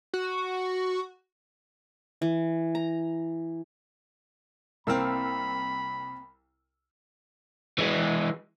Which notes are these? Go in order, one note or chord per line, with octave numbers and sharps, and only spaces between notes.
F#4
E3
A#5
C2 A#3 C4 B5 E6 F6
E3 G#3